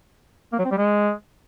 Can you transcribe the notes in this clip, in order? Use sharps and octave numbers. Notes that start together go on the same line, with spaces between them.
A#3
F#3
C4
G3
G#3